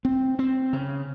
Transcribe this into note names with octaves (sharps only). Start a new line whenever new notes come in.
C4
C4
C#3